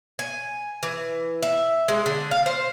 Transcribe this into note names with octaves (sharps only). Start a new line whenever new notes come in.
G#5
E3
E5
G#3
D3
F5
C5